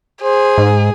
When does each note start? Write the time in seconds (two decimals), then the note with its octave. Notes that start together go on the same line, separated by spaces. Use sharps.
0.22 G#4 C5
0.58 G#2